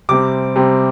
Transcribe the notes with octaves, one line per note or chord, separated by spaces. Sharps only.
C3 G3 C4 D6
C3 G3 C4